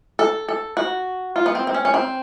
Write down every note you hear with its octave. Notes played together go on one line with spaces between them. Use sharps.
A4
A4
F#4
F4
B3
C4
C4
C#4
C#4
C4